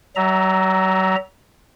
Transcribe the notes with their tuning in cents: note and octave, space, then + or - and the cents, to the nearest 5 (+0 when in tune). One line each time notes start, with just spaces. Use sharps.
F#3 +40 E5 -25 A#5 +0